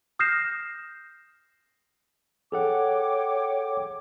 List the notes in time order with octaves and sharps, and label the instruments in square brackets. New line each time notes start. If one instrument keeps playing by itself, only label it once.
[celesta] D#6 F6 G6 A#6 C7 E7
[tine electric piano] G#4 A4 F#5 [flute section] C#5 G5 D6